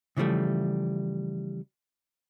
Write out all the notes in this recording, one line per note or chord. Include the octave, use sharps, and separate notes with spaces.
C#3 E3 F3 G3 A3